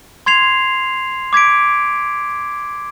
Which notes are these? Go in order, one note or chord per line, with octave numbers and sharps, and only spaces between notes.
C6 G#6 C7 F7
D6 G#6 B6 D7